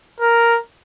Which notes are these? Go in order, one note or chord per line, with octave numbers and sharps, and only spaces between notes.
A#4